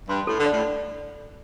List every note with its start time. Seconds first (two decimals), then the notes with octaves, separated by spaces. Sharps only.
0.08 G2 C6
0.27 A2 A4
0.39 D3
0.46 D5
0.52 A2